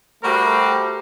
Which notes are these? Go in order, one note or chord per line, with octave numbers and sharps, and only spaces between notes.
G3 A3 F#4 G4 A#4 C5